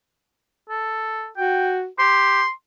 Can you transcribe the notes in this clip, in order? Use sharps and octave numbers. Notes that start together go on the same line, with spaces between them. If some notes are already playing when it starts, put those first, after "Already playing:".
A4
F#4 G5
G4 C6